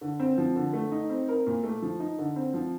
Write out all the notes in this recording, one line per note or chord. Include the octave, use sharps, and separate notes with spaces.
D3
C4
F3
D3
A3
D#4
C4
A#4
A#2
A3
F3
D#4
D3
C4
F3